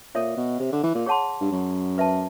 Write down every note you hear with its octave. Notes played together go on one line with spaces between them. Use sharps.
A#2 A4 C#5 E5
B2
C3
D3
E3
A#2
G#4 C#5 F#5 A5 C6
G2
F#2
B4 E5 A5